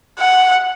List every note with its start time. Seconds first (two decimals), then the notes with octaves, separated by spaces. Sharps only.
0.19 F#5